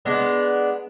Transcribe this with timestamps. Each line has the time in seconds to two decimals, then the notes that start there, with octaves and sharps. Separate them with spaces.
0.05 G#3 B3 D4